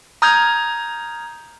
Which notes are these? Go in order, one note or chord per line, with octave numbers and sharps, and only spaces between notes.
A#5 D#6 F6 G6 G#6